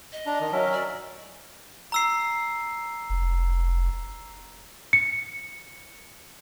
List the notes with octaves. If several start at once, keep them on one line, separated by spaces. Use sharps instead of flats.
D#5
D4 A#5
D#3
F#3 C#4 A#4 E5
D5
A#5 E6 C7
F1
C#7